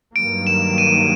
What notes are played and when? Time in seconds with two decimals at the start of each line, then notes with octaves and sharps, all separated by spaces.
0.15 G2 D#3 F#3 A#3 D7
0.47 E7
0.78 D#7